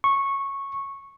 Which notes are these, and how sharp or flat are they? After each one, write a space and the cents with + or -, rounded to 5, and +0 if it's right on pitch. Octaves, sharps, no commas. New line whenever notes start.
C#6 -10